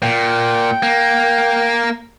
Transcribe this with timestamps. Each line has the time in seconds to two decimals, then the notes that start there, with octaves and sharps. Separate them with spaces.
0.03 A#2 G5
0.83 A#3